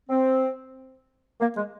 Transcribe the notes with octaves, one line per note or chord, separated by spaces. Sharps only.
C4
A#3
G#3